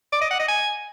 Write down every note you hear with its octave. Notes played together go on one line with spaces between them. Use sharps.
D5
D#5
F#5
D#5
G#5